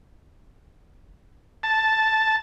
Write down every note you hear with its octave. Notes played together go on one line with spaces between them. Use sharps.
A5